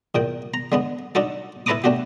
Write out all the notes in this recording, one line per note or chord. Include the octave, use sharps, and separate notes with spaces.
E2 A#2 G5
A#5
D3 G#3 B3
D4 D#4 F#4 A4
E4 A4 B4 A#5 D6 D#6
A3 D4 F#4 G4